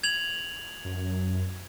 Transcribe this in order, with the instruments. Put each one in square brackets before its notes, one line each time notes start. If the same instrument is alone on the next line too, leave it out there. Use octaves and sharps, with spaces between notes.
[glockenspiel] G#6 F7 F#7
[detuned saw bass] F#2